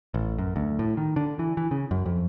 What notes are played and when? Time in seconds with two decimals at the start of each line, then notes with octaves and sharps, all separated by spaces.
0.14 A1
0.38 F#2
0.56 D2
0.79 A2
0.97 D#3
1.16 D3
1.39 E3
1.57 E3
1.71 C#3
1.91 F#2
2.06 F2